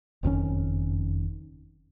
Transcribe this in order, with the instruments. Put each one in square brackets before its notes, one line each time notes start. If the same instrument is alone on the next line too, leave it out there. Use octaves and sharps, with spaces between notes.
[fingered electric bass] F#1 F2 D#3 C#4